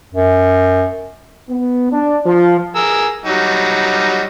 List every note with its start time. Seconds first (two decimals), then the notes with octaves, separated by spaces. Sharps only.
0.14 F#2
1.49 B3
1.92 D4
2.26 F3
2.76 G#4 A#4 E6
3.26 F#3 G3 D#4